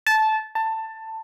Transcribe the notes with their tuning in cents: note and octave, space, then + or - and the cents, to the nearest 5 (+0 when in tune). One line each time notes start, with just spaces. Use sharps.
A5 -15
A5 +15